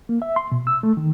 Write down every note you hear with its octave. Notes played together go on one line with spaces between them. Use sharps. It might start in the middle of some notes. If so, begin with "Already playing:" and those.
A#3
E5
C6
B2
E6
A3
D#3